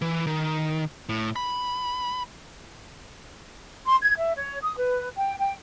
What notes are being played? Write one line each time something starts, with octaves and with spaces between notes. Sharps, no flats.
E3
D#3
A2
B5
C6
G#6
E5
C#5
D#6
B4
G5
G5